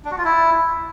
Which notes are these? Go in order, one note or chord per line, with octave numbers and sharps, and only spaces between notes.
D4
F#4
F4
E4